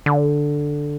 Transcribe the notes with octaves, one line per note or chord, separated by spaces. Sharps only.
D3